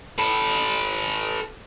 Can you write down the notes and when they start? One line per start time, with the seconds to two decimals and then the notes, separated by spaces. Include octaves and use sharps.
0.18 A4 B4